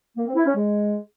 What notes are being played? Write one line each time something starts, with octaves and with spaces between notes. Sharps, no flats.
A#3
C4
E4
C#4
G#3